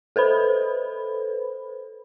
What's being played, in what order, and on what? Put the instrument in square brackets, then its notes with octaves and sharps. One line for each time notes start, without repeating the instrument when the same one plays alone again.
[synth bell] A4 B4 C5 B5